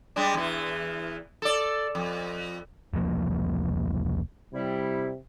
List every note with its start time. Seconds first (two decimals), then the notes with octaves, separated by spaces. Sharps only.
0.16 G3 G#3 D4
0.34 E2 E3
1.42 A4 D5
1.95 F2
2.93 E1 C2 F3 A#3
4.53 C3 G3 E4